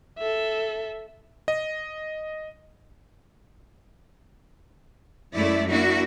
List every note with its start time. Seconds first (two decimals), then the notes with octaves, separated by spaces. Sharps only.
0.18 A4 E5
1.48 D#5
5.34 F#2 G#3 A3 E4 D5
5.70 A#3 D4 E4 F#4